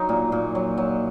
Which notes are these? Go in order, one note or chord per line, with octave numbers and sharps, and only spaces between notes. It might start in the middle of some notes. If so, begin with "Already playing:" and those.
Already playing: F#3 D#4
A#2
A#2
F#3
F#3